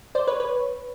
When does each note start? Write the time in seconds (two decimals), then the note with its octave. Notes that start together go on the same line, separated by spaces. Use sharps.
0.15 C5 D5
0.27 B4 C#5
0.40 B4 C#5